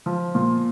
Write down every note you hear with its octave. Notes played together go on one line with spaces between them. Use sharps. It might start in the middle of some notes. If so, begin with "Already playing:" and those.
F3
A#2